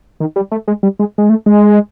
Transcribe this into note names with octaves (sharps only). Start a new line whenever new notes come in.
D#3
G3
A3
G#3
G3
G#3
G#3
A3
G#3